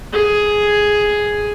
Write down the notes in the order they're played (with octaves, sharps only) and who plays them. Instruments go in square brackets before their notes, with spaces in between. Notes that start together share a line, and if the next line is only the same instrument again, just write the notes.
[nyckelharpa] G#4